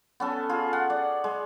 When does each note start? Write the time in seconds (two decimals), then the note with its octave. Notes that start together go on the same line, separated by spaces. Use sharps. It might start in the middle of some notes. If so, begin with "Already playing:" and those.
0.20 B3 C#4 A4
0.49 F4 G#4
0.73 F#5
0.90 D5
1.24 G#3